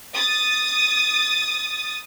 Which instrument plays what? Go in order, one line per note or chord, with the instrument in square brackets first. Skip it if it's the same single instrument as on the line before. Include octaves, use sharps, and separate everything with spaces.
[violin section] D#6 A6